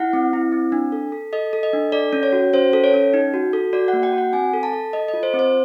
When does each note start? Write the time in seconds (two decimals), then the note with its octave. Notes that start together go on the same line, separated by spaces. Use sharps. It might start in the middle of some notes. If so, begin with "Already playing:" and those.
Already playing: E4 F#5
0.13 C4
0.33 E4
0.52 C4
0.72 D4
0.92 A4
1.12 A4
1.33 A4 D#5
1.53 A4
1.63 D#5
1.73 D4
1.92 A4 D5
2.13 C#4
2.23 C#5
2.33 F#4
2.53 C#4 C5
2.73 A4
2.84 C#5
2.94 C#4
3.14 D#4
3.34 F#4
3.53 A4
3.73 F#4 D5
3.88 F#5
3.93 A#3
4.03 G5
4.13 F#4
4.18 F#5
4.33 C4 G#5
4.53 A4
4.63 A5
4.73 A4
4.93 A4 D#5
5.08 D#5
5.14 F4
5.23 C5
5.34 C4
5.39 C5